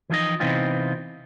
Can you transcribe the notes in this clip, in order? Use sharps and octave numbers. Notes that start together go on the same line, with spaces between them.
E3 F3 D#4 D#5
C3 E3 B3 C4 D#4 F4